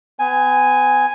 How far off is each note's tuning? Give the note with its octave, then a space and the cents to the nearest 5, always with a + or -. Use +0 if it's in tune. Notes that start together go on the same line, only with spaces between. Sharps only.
B3 +40 G#5 +0